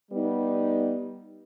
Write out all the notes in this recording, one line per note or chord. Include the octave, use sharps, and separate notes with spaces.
G3 B3 D#4